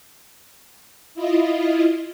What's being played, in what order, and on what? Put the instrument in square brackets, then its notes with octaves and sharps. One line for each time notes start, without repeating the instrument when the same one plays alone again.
[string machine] E4 F4 D#5